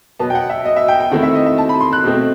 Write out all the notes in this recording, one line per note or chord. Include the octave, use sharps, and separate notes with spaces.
B2 F#3 B3 A5
G5
F#5
E5
D#5
E5
G5
G5
D#3 A3 C4 E4 F#5
E5
D#5
E5
A5
B5
C6
F#6
B2 A3 C4